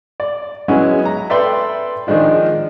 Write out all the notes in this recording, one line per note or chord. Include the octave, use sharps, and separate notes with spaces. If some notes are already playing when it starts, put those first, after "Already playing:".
D5
F#3 G#3 B3 C#4 E4
A#5
A4 B4 D5 E5 G5 C6
D#3 F3 G#3 D4 F4